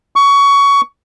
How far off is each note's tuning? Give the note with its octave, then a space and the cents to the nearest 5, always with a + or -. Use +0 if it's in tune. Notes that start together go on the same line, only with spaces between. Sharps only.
C#6 +20